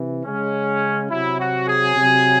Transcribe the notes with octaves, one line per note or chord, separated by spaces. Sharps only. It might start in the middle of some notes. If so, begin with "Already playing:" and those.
Already playing: C3 E3
C#3 G#3 C#4
C3 F#3 E4
F#4
G#4
C3 F#3